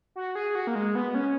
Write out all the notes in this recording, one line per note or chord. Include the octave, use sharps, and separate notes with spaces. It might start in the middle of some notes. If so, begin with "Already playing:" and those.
F#4
G#4
F#4
A#3
G#3
B3
C#4